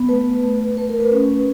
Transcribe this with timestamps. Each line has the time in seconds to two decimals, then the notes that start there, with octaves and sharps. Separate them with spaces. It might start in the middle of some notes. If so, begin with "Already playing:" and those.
Already playing: B3
0.09 A3 B4
0.43 A3
0.77 A3 B4
0.89 A#4
1.00 B4
1.12 C#4